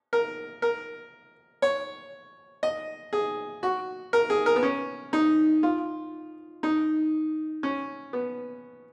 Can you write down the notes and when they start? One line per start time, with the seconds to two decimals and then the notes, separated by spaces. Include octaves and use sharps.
0.13 A#4
0.62 A#4
1.62 C#5
2.63 D#5
3.13 G#4
3.63 F#4
4.13 A#4
4.30 G#4
4.46 A#4
4.56 B3
4.63 C#4
5.13 D#4
5.63 F4
6.63 D#4
7.63 C#4
8.13 B3